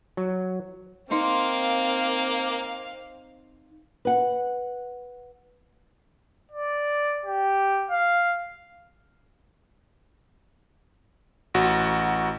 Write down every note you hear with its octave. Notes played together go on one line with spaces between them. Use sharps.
F#3
A#3 C4 D#4 C5 F5
B4 F#5
D5
G4
F5
A1 F#4